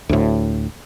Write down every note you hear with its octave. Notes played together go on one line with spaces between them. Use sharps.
D2 A2